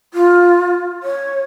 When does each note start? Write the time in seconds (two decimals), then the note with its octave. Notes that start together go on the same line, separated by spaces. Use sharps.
0.14 F4
1.03 C#5